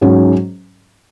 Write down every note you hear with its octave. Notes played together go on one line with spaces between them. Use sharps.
G#2 F#3 C#4